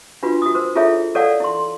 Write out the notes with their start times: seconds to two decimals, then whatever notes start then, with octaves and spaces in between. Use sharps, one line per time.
0.23 D4 F4 F#4 B4
0.42 F#4 D#6
0.55 A#4 C5
0.75 E4 F4 G#4 A4 C#5 E5
1.15 A4 A#4 C#5 D5 F5 F#5
1.40 E4 C6